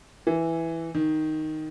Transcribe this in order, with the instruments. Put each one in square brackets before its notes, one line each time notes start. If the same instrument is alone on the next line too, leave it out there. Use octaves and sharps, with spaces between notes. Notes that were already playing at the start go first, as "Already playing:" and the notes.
[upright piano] E3
D#3